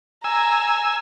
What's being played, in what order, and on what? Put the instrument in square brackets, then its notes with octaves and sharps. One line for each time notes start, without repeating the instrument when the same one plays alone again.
[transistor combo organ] G#5 E6 [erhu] A#5